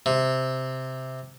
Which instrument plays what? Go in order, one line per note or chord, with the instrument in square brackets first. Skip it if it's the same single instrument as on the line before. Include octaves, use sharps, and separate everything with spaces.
[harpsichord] C3